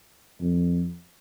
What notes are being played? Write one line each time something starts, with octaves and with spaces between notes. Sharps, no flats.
F2